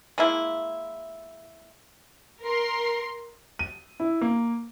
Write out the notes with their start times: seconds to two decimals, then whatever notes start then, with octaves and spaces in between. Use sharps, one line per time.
0.18 G#3 A#3 E4
2.44 A#4 C6
3.59 D#7
4.00 E4
4.21 A#3